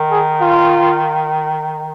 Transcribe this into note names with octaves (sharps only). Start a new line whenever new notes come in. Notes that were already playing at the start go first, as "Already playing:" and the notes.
Already playing: D#3
G#4
F4